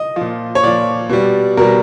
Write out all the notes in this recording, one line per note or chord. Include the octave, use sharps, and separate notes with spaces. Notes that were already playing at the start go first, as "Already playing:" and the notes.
Already playing: D#5
F3
A#2
C#5
A#2 F3 D5
B2 G3
B2 G3 A#4